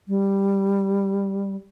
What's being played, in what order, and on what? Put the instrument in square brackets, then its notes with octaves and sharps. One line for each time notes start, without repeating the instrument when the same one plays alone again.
[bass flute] G3